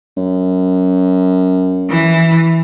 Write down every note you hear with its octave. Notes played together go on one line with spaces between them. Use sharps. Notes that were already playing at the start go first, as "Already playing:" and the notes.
F#2
E3